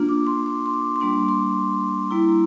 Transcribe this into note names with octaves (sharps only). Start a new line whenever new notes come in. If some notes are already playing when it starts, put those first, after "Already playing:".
Already playing: A#3 D4 F4
D6
C6
D6
C6
D6
C6
G3 A#3 D4 D6
C6
G3 A#3 E4 A#5